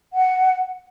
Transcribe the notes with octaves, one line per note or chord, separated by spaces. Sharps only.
F#5